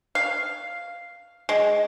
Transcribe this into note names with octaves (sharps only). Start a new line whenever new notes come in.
F5
G#3